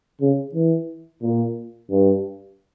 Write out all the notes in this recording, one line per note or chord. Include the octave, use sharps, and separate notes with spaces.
C#3
E3
A#2
G2